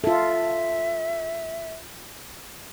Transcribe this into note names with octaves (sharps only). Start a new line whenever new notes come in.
F4 A4 E5